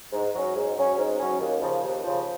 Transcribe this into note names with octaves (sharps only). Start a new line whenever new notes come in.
G#2
F#3 C#4
G#2
F#3 C#4
G#2
F#3 C#4
D#2
C#3 F3
D#2
C#3 F3